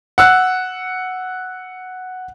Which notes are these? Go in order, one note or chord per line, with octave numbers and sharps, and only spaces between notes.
F#5 E6 F#6